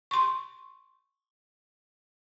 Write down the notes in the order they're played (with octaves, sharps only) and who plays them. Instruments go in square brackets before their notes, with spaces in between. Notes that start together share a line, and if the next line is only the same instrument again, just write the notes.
[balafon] C6 C#6